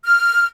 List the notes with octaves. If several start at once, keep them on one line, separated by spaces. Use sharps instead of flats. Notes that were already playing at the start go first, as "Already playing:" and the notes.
F6